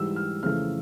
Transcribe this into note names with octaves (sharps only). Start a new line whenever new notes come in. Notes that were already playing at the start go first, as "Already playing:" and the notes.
Already playing: G#2 E3 G3 E6
F6
F2 C#3 E3 A3 F6